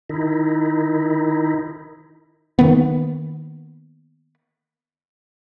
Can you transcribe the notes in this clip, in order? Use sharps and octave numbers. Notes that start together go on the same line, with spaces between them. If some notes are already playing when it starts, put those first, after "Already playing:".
D#3 D#4 E4
D#3 A#3 B3